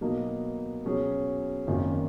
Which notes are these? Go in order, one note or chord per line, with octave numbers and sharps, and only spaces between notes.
B2 F#3 A#3 D#4
B2 F#3 C#4 G#4
G#1 F#2 D#3 A#3